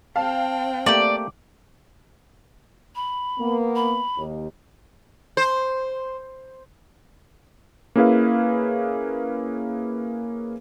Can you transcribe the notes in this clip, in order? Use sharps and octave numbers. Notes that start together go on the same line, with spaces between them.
C4 F5 G5 A5
A3 A#3 G4 D5
B5
A#3 B3
B5
D#2
C5
A#3 C#4 E4 G#4 B4 F5